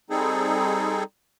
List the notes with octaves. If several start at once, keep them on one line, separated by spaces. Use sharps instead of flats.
G3 C4 D#4 G#4 A4